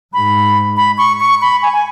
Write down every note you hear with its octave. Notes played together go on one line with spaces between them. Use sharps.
G#2 B5
B5
C#6
C#6
B5
G#5
G#5